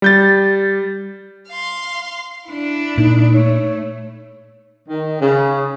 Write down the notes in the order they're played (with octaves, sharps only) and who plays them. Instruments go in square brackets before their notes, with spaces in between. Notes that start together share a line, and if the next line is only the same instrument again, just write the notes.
[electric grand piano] G3 G6 A6
[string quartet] F5 C6
D4 E4
[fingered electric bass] A#2 [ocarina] D#4
[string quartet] A3 [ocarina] C#5
[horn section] D#3
C#3